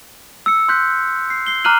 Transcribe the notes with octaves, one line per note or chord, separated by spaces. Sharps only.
E6 C#7
C6 E6 F#6 G6 B6
C7
C7 G7
A#5 D6 F6 F#6 D#7 F#7